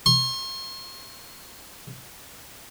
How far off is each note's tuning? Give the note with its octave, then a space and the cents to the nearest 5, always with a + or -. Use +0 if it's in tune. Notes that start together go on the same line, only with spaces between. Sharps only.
C6 +40